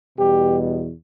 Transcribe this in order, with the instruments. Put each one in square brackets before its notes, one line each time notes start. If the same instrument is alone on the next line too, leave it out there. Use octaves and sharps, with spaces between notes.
[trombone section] E2 B2 G3 G4